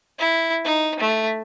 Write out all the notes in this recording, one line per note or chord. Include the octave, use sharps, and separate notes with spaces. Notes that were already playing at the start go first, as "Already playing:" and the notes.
E4
D#4
A3